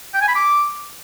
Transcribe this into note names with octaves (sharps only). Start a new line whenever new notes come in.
G5
G#5
B5
D6